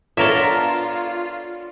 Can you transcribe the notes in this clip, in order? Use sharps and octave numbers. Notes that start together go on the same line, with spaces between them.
B3 D4 F4 A4 A#4 C#5 E5